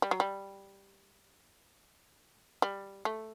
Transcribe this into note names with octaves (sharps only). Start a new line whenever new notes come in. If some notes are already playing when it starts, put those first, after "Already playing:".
G3
F#3
G3
G3
A3